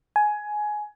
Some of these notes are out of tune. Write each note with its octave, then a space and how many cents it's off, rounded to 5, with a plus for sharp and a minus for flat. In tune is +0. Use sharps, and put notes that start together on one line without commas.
G#5 +15